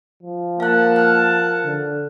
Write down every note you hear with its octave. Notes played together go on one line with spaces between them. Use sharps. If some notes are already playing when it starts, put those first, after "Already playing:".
F3
A#3 A#4 F5 F#5 A5 F#6
F6 F#6
D3